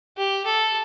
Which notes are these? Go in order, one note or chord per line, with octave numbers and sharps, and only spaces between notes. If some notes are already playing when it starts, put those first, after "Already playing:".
G4
A4